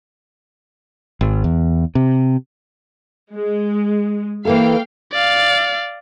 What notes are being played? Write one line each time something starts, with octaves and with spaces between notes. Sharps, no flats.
G#1
E2
C3
G#3
E3 A#3 A4 F5 G5
D5 F5